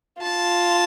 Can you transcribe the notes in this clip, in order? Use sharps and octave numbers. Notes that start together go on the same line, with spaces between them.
F4 A5